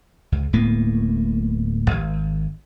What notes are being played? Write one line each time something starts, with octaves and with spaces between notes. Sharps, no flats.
C#2
D1 A2 A#3 B3
G#1